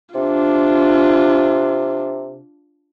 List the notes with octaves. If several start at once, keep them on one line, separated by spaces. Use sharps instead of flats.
C3 D4 F4